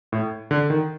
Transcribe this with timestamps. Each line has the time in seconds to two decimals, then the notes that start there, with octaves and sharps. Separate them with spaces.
0.12 A2
0.51 D3
0.70 D#3